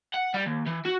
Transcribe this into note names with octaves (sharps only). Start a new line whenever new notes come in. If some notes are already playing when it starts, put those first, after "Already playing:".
F#5
G3
D#2
E3
F#4